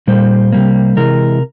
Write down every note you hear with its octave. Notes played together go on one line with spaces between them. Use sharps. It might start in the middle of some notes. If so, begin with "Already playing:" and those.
A#2 G3 A#3 C5
C3 G3 A#3
C3 E3 G#3 A#4